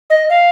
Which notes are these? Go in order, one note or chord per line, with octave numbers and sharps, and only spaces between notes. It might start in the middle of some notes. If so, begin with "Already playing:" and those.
D#5
F5